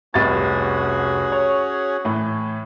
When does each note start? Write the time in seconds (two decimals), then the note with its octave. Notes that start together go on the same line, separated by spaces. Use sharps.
0.14 F1 C2 C#4 F#4 G#4 A6
1.32 C#5
2.05 A2 E3